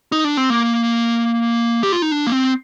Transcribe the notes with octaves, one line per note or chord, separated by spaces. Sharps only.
D#4
D4
C4
A#3
G4
F4
D#4
D4
A#3
C4